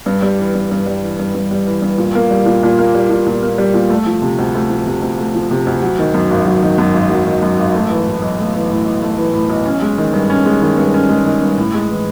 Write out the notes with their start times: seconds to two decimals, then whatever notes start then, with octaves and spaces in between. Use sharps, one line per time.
0.06 G2
0.22 G3
0.39 E3
0.55 G2
0.71 G2
0.86 G3
1.03 E3
1.19 G2
1.34 G2
1.51 G3
1.66 E3
1.82 G2
1.98 A#2
2.15 A#3
2.31 G3
2.46 A#2
2.63 A#2
2.79 A#3
2.94 G3
3.10 A#2
3.26 A#2
3.43 A#3
3.58 G3
3.74 A#2
3.90 A3
4.06 F3
4.22 C3
4.39 D2
4.55 A3
4.70 F3
4.86 C3
5.02 D2
5.18 A3
5.35 F3
5.51 C3
5.67 D2
5.82 F#3
5.99 D#3
6.14 F#2
6.31 G#1
6.46 F#3
6.62 D#3
6.78 F#2
6.94 G#1
7.10 F#3
7.26 D#3
7.42 F#2
7.59 G#1
7.75 A3
7.90 E3
8.06 A2
8.22 B1
8.39 A3
8.55 E3
8.70 A2
8.86 B1
9.02 A3
9.17 E3
9.34 A2
9.50 B1
9.66 C#4
9.82 G#3
9.98 D#3
10.13 G2
10.30 C#4
10.45 G#3
10.62 D#3
10.78 G2
10.94 C#4
11.09 G#3
11.26 D#3
11.42 G2
11.58 A2
11.74 G#3
11.90 E3